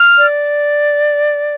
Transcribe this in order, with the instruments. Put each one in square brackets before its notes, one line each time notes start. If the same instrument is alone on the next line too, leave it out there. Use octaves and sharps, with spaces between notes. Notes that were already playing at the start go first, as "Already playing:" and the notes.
Already playing: [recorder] F6
[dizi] D5